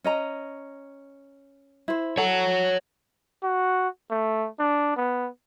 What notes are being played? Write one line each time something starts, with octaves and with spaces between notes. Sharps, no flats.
C#4 D#5 A#5
E4 C5
A4 C#5 F#5
F#4
A3
D4
B3